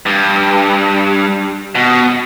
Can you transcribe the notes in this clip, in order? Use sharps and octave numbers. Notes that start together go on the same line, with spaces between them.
G2
B2